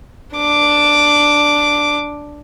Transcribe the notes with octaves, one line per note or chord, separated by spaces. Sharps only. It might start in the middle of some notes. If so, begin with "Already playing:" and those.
D4 D6